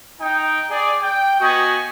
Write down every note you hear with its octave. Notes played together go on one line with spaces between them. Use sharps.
D#4 G5
G#4 D5
G5
B3 F#4 D#5 G#5